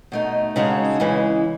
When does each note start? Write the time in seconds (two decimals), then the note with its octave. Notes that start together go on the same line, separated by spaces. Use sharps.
0.12 B2 A3 D#4
0.56 C#3 G#3 D#4 F#4 A4
1.00 C#3 E3 G#3